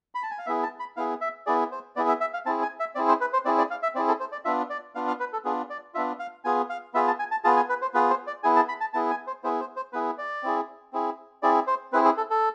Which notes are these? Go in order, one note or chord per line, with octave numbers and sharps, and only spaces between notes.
B5
A5
G#5
F5
B3 E4 G#4 E5
A5
B5
B3 E4 G#4 F5
E5
B3 E4 G#4 D5
C5
B3 E4 G#4 D5
E5
E5
F5
C4 E4 G#4 A5
G#5
E5
C4 E4 G#4 D5
C5
B4
C5
C4 E4 G#4 D5
D5
F5
E5
C4 E4 G#4 D5
A4
C5
D5
B3 D4 F4 E5
D5
B3 D4 F4 F5
F5
B4
A4
B3 D4 F4 G#4
D5
B3 D4 F4 E5
F5
B3 F4 G#4 G#5
F5
B3 F4 G#4 E5
A5
G#5
A5
B3 F4 G#4 A5
G#5
B4
C5
B3 F4 G#4 B4
C5
D5
B3 E4 G#4 G#5
A5
B5
A5
B3 E4 G#4 A5
G#5
C5
B3 E4 G#4 C5
C5
C5
B3 E4 G#4 B4
D5
C4 E4 G#4
C4 E4 G#4
C4 E4 G#4 D5
C5
C4 E4 G#4 B4
G#4
A4
A4